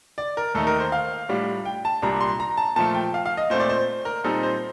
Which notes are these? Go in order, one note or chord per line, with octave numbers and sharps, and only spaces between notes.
D5
A#4
D#2 D#3 A3 D#4 A4
A#4
C5
F5
A2 G3 D4 F4
G5
A5
C2 A#2 G3 D4 A#5
C6
A#5
A5
A#2 F3 A3 A5
G5
F5
F5
D#5
A#2 A3 C4 C5
D5
C5
A#4
A#2 G3 C4 D#4 A4
C5